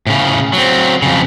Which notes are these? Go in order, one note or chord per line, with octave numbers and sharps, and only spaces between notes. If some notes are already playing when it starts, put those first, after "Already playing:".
A2 C#3
F#3 C4
F2 C#3